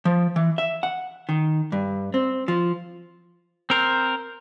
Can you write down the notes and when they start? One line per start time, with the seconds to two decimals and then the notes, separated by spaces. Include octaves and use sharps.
0.05 F3
0.36 E3
0.58 E5
0.83 F#5
1.29 D#3
1.72 G2
2.14 C4
2.48 F3
3.70 C4 A#4 C5